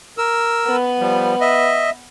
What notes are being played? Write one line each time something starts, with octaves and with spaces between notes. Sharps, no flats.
A#4 E6
B3 B4
F3 G3
D#5 E5